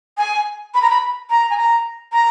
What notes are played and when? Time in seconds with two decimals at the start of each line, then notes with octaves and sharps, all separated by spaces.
0.17 G#5
0.74 B5
0.82 A#5
0.89 B5
1.29 A#5
1.50 G#5
1.57 A#5
2.12 A#5